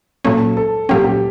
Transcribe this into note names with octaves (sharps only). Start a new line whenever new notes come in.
A#2 F#3 A#3 C#4 A4
A4
A#2 F#3 A#3 C#4 G4
G4